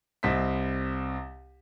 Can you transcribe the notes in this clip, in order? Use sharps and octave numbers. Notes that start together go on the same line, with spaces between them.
C2 C4 D#5 B6